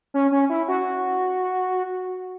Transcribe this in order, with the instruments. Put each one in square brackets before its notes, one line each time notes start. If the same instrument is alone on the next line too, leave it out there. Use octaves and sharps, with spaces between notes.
[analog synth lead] C#4
C#4
E4
F#4